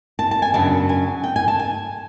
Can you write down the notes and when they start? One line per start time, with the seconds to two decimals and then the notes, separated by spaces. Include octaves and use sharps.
0.19 A5
0.31 A5
0.42 G#5
0.54 F#2 C#3 F#3 B3 D4 A5
0.89 G#5
1.24 G5
1.36 G#5
1.48 A5
1.59 G#5